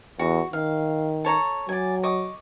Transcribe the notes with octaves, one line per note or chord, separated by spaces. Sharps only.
E2 F#4
D#3 F5
A4 C#5 A#5
F#3 D5 G#5
D#5 C#6 D6